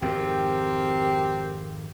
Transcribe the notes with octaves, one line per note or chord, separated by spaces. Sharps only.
G#1 F2 G#2 C4 G4 A#4